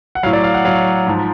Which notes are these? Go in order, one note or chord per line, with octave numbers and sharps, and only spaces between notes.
F#5
A2 F#3 F5
D5
F5
F#5
A2 F#3 F5
G#2 F3